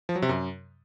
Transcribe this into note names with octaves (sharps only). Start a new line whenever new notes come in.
F3
F#3
C3
F#2